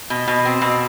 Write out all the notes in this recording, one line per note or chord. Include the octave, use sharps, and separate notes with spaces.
B2
B2
C4
B2